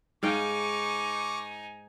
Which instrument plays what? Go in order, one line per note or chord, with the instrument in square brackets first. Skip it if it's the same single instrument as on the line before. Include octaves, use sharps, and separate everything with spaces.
[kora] G#2 F5 G5 [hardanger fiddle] D#4 G#5 [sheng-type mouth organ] C#6 D6